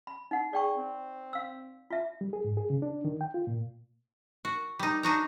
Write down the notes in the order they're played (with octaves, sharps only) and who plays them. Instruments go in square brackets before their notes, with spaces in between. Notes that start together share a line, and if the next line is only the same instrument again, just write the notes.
[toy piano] B5
D#4 F#5
[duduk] G#4 [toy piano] D5 G5 C#6
[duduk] C4
[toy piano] F5 E6
F4 E5
[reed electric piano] G3
G#4
G#2
G#4
C#3
D4
D#3
G5
F4
A#2
[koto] F#4
G3 D#4
D4 D#4 F#4 A#5